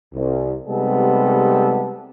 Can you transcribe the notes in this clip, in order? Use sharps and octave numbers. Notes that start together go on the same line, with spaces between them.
C2
C3 G3 G#3 B3 D#4 A4